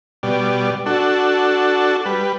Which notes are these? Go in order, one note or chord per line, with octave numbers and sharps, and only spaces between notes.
B2 G3 D5
D4 F#4 A4
G3 B4